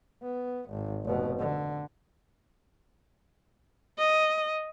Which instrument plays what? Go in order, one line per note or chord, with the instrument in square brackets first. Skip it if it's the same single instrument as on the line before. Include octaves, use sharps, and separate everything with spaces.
[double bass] B3
G#1
F1 B2
D3
[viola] D#5